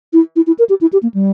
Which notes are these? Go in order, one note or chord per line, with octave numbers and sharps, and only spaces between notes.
E4
E4
E4
A#4
G4
E4
G4
A#3
G3